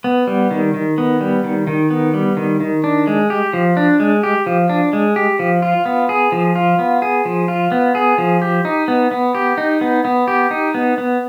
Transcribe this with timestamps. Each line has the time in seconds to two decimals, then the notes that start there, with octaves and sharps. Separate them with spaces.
0.04 B3
0.27 G3
0.51 D#3
0.74 D#3
0.98 B3
1.21 G3
1.44 D#3
1.67 D#3
1.90 B3
2.14 G3
2.37 D#3
2.60 D#3
2.84 D4
3.07 G#3
3.30 G4
3.53 F3
3.77 D4
4.00 G#3
4.23 G4
4.46 F3
4.69 D4
4.93 G#3
5.16 G4
5.39 F3
5.62 F4
5.86 B3
6.09 G#4
6.32 F3
6.55 F4
6.79 B3
7.02 G#4
7.25 F3
7.48 F4
7.72 B3
7.95 G#4
8.18 F3
8.42 G4
8.65 D#4
8.88 B3
9.11 B3
9.35 G4
9.58 D#4
9.81 B3
10.05 B3
10.28 G4
10.51 D#4
10.74 B3
10.98 B3